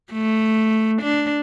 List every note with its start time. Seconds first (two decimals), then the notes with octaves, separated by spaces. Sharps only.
0.13 A3
1.02 D4